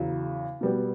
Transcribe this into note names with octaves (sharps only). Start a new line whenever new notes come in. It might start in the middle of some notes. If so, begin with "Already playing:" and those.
Already playing: E2 C#3 F#3
B2 G3 B3